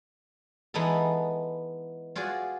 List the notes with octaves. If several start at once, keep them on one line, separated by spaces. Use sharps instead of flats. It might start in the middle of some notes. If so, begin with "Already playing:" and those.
E3 G#3 B3 D#4 A4
F4 F#4 G#4 D5